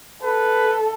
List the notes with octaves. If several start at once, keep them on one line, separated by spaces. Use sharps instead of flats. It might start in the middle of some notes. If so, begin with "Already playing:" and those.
A4 B4